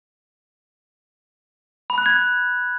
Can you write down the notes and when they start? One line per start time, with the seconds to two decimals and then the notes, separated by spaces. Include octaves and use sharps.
1.90 B5
1.98 F#6
2.06 G#6